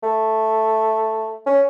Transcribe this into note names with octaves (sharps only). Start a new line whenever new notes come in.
A3
C#4